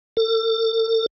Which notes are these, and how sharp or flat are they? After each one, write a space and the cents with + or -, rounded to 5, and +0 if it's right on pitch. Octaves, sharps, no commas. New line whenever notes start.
A4 +40